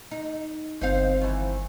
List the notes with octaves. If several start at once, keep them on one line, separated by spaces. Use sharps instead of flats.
D#4
G1 C4 D#4 C5 F5
D#3 E3